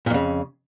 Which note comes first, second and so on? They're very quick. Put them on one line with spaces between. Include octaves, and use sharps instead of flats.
A#2 F2 C#3